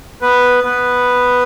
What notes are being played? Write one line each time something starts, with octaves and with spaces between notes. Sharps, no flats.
B3 B4
B3 B4